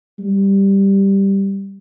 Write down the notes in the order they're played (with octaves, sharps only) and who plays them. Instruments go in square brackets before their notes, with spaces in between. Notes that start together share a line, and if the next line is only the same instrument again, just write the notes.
[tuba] G3